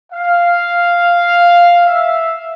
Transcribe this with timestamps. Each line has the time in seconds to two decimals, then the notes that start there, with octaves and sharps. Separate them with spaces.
0.12 F5
1.85 E5